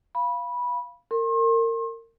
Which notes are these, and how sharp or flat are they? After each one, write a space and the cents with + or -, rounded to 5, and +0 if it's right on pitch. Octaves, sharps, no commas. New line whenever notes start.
F5 -10 B5 -15
A#4 -30 C6 +40